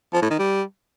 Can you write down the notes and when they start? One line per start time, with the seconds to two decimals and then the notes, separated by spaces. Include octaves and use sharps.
0.13 F3
0.22 A2
0.30 D#3
0.39 G3